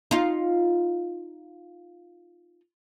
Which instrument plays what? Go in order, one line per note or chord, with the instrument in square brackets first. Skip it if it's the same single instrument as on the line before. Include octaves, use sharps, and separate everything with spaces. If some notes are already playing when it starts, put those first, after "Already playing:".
[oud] D#4 F4